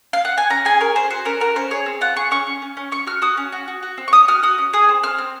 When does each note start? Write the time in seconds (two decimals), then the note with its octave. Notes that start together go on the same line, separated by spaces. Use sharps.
0.13 F5
0.25 F#5
0.37 G#5
0.50 C#4 A#5
0.65 G#4 G#5
0.80 C#4 A#4
0.95 G#4 C5
1.10 F#4 C5
1.25 C#4 A#4
1.40 F#4 A#4
1.56 C#4 C5
1.71 G#4 C#5
1.86 C4
2.01 F4 F#5
2.16 G#4 C#6
2.31 C#4 C#6
2.47 C#4
2.62 C#4
2.77 C#4
2.92 C#4 C#6
3.07 F#4 F6
3.22 F#4 D#6
3.37 C#4
3.52 F#4
3.68 F#4
3.83 F#4
3.98 C4
4.08 C#6
4.13 C#4 D#6
4.28 F#4 F6
4.43 F#4 D#6
4.58 C#4
4.73 G#4 D#6
4.88 C4
5.03 C4 F6
5.18 C4